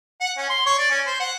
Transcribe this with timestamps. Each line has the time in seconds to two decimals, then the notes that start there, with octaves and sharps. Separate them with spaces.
0.21 F#5
0.38 C#4
0.50 C6
0.66 C#5
0.79 D5
0.91 C#4
1.07 C5
1.20 F#5